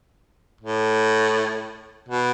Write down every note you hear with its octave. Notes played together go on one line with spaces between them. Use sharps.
A2
B2